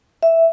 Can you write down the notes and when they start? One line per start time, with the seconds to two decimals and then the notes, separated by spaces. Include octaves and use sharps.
0.23 E5